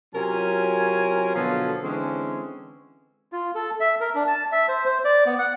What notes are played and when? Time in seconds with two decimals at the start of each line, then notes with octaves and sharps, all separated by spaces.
0.15 C3 F#3 C#4 F4 A#4 G#5
1.35 B2 D3 F3 F#3 B3 A4
1.83 D3 E3 G#3 C4 C#4
3.32 F4
3.55 A4
3.80 E5
4.01 A#4
4.15 D4
4.28 A5
4.52 E5
4.68 C5
4.85 C5
5.05 D5
5.26 B3
5.38 F#5